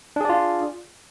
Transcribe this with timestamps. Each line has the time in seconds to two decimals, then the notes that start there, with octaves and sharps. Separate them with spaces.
0.16 D4
0.21 G#4
0.25 D5
0.30 F4